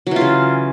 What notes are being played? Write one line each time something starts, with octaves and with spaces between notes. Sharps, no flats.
C#3 E3 F#3 F4